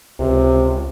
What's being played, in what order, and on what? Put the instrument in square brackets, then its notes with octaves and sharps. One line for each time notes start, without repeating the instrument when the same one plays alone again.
[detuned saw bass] C#2 [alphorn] C3